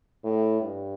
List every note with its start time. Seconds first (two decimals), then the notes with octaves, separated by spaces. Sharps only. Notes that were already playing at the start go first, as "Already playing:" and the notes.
0.24 A2
0.61 G2